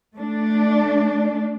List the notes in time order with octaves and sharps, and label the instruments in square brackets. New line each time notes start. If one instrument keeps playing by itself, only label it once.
[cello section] A3 D4